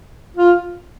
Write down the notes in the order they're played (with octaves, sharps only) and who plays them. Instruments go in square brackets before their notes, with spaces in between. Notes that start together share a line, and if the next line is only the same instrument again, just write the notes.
[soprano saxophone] F4